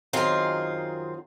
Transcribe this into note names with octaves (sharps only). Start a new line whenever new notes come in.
F#2 D#3 C4 F4 G#4 F5